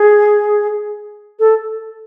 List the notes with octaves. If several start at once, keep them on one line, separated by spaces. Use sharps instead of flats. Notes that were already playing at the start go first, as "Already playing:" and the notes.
Already playing: G#4
A4